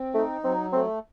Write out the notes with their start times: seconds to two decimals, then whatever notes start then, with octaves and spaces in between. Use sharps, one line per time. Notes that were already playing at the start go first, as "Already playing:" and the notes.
Already playing: C4
0.14 A3 D#4
0.44 F#3 C4
0.73 A3 C4